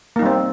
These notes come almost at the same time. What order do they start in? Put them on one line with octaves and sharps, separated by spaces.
A#3 D#4 G3 C4